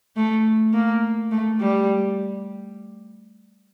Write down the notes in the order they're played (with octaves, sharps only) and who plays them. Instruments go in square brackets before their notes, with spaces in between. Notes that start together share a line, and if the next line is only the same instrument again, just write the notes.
[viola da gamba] A3
A#3
A3
G3